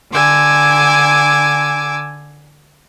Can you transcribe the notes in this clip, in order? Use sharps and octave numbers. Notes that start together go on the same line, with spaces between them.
D3 G#5 D6 E6